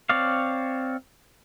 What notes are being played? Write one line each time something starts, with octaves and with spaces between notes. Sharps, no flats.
C4 C#5 D5 F5